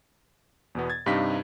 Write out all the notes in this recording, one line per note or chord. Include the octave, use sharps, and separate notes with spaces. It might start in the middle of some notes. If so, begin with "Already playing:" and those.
E2 B2 B3
G#6 A6
G2 C3 D#4 G4 F5 B6